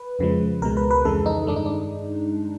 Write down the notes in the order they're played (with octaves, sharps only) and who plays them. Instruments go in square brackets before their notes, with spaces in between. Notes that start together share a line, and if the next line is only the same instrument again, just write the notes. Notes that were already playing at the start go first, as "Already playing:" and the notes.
Already playing: [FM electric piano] B4
F2 C#3 F3 G#3
C#2 B2 G#3 A#4
B4
B4
F2 C#3 E3 G#3 A4
D#4
G2 D#3 G#3 D4
D#4
D4